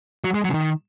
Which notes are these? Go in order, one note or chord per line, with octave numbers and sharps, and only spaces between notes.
F#3
G#3
F#3
C#3
D#3